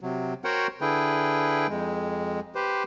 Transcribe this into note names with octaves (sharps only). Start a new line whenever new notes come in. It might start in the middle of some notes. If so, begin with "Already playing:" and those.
C3 F#3
F#4 A#4 C5 C#5 F#5 G5
D3 E4 G#4 B4 G5
F2 G#3
G4 B4 C5